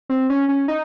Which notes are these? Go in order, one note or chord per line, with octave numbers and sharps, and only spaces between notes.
C4
C#4
C#4
D#4